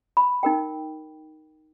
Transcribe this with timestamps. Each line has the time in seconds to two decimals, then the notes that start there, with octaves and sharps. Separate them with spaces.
0.17 B5
0.43 D#4 A#4 G5